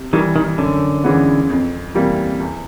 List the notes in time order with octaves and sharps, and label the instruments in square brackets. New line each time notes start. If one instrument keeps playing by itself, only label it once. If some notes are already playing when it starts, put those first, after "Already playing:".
Already playing: [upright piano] C3
[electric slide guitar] D#3 [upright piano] E3 G3
[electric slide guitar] D#3
[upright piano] F#2 [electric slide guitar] D3
[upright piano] C#3 E3 G#3 B3
F2
C3 E3 G3 A#3
E2